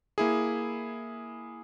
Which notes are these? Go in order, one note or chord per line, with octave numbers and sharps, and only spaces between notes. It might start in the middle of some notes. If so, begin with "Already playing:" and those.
A#3 E4 G#4